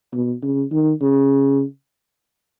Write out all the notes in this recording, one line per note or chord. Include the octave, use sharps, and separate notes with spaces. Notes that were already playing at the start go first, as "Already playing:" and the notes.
B2
C#3
D#3
C#3